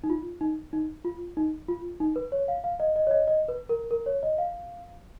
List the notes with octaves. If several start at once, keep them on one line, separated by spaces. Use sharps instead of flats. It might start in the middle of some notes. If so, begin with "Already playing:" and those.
D#4
F4
D#4
D#4
F4
D#4
F4
D#4
B4
C#5
F5
F5
D#5
D#5
C#5
D#5
D#5
B4
A#4
A#4
C#5
D#5
F5